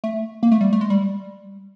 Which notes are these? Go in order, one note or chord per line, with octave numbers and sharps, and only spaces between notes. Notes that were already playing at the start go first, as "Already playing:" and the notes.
A3
A#3
A3
G3
A3
G#3
G3